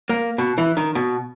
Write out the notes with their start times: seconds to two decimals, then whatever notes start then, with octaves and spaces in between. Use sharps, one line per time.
0.09 A#3
0.38 B2
0.58 E3
0.77 D#3
0.95 B2